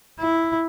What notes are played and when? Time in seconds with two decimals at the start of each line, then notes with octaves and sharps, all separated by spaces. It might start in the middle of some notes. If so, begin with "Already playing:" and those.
0.20 E4